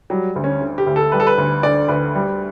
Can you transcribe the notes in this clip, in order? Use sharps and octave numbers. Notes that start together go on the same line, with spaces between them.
F#3 G3
D2
C#4
D3
G4
D2
A4
G3 B4
A4
B4
D2
D3 D5
D2 B4
G3